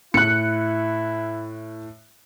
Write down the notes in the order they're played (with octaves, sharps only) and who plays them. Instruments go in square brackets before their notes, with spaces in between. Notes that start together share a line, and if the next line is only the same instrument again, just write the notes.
[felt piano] A2 [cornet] E4 [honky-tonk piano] F#6 C#7